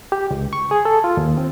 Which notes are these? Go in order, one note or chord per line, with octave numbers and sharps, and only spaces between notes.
G4
C#2
C#6
G#4
A4
F4
D#2
C4